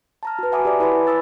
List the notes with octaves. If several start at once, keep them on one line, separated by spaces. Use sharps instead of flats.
A5 A#5 F6
F#4 B4
E5 F#5 G#5 B5 D6 D#6
G4 D5 A5
E4 B4 C#5 G#5 B5 C6
B5 D#6 E6 A6